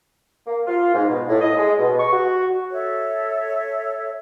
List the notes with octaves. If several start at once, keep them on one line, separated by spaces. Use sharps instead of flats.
A#3
F4
G#2
B2
A2
D#5
G#3
B2
C#6
F#4
A4 C#5 E5